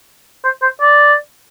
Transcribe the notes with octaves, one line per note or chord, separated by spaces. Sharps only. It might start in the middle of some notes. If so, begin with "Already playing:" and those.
C5
C5
D5